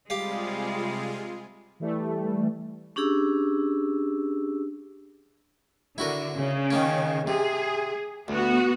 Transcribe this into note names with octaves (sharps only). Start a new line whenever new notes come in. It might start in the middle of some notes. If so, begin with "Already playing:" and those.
C3 G3 G#3 F4 G4 G#4 F5
E3 G3 A3
C#4 D4 G4 G#4 E6
D3 E4 F#4 A#4
C#3
D#3 A#3 C#4
C3 G#4
D2 B3 F#4